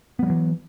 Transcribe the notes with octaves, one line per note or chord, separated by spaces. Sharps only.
E3 F#3 G3 B3